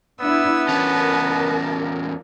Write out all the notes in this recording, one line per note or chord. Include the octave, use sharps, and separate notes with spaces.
B3 D4 E4 E6
E2 C#4 A#4 A5